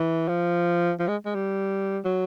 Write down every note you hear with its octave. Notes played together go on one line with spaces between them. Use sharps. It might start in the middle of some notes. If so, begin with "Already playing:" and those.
Already playing: E3
F3
F3
G#3
G#3
G3
F#3